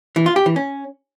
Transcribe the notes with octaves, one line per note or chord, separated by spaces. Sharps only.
E3
F4
G4
E3
C#4